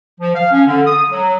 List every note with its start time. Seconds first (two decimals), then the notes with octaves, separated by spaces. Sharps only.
0.20 F3
0.35 F5
0.52 C#4
0.67 D3
0.86 D#6
1.11 F#3